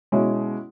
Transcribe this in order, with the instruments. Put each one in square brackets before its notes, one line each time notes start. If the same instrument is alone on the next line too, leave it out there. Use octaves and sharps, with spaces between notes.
[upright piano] B2 G#3 C#4 E4